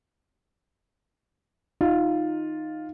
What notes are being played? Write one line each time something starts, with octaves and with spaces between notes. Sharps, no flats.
D#4 F4